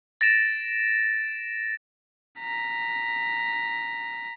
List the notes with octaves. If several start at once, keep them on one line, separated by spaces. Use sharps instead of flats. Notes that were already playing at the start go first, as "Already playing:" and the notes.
A6 A#6 D7 E7
A#5 B6